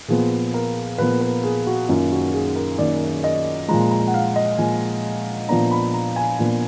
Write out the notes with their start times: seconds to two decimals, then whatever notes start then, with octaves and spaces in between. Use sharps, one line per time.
0.08 A#2 F3 B3 G#4
0.54 A#4
0.98 A#2 F3 B3 B4
1.21 B4
1.44 G#4
1.67 F#4
1.89 F#2 D#3 A#3 D#4 F4
2.12 F#4
2.33 G#4
2.56 A#4
2.78 F#2 D#3 A#3 D#4 D5
3.24 D#5
3.68 A#2 F3 G#3 A#5
3.91 A#5
4.08 F#5
4.14 F5
4.36 D#5
4.58 A#2 F3 G#3 G#5
5.48 A#2 F3 B3 D4 A#5
5.71 B5
5.94 A#5
6.16 G#5
6.39 A#2 F3 B3 D4